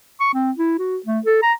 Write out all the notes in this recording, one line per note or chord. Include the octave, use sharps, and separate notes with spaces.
C#6
C4
E4
F#4
A3
A4
A#5